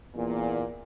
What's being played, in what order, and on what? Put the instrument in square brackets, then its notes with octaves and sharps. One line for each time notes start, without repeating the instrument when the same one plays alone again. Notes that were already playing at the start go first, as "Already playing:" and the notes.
[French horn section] E2 A#2